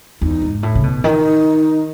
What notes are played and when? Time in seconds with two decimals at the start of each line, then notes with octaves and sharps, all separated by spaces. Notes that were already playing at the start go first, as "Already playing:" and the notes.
0.21 E2 D#4
0.42 G#2
0.63 A2
0.75 C#3
0.83 B2
1.04 D#3 E4
1.09 D#4